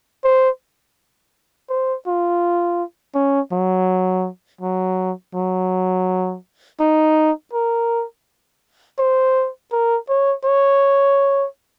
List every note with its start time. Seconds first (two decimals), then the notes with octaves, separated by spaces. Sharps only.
0.24 C5
1.70 C5
2.07 F4
3.15 C#4
3.52 F#3
4.61 F#3
5.35 F#3
6.80 D#4
7.53 A#4
8.99 C5
9.72 A#4
10.09 C#5
10.45 C#5